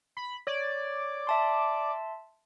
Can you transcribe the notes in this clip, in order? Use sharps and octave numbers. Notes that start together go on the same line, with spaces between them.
B5
C#5 D5
E5 A5 C6